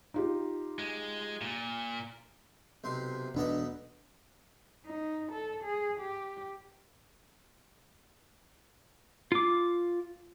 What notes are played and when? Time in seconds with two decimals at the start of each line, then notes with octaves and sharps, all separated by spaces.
0.14 D#4 F4 G4
0.79 G#3
1.41 A#2
2.84 B1 C3 C6
3.35 E1 B1 B3 D4 D#5
4.87 D#4
5.32 A4
5.64 G#4
6.01 G4
9.32 F4 D6